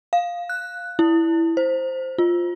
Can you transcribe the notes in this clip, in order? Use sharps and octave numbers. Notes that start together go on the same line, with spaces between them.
F5
F#6
E4
C5
F4